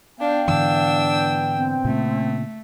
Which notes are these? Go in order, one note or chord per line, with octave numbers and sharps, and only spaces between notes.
B3 D4 F5 G5
G#2 D3 E3 D4 E6
C4
A#2 C#3 A3